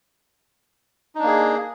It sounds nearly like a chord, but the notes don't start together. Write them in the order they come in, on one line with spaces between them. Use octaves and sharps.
D#4 D4 A#3 G#4